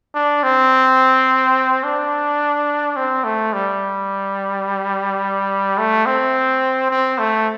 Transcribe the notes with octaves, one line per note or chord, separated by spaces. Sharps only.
D4
C4
D4
C4
A3
G3
A3
C4
C4
A3